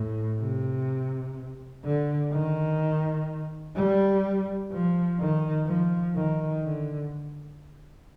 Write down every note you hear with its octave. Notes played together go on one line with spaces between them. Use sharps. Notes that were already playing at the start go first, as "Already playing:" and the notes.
Already playing: A2
C3
D3
D#3
G3
F3
D#3
F3
D#3
D3